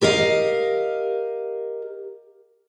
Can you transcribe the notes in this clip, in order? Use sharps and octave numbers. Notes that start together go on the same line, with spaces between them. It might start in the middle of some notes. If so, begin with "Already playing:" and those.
G4 A#4 D#5 F5